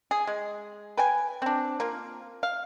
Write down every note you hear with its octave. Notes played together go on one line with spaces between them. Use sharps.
G#4
G#3
B4 G5 G#5
C4 D4
A#3 F4
F5